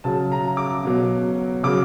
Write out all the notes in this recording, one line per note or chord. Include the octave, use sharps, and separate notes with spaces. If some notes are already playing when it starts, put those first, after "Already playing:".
C#3 F#3 A5
A#5
D6
B2 F#3
C#3 F#3 D6